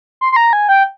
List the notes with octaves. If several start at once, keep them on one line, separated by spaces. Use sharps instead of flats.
C6
C6
A#5
G#5
G5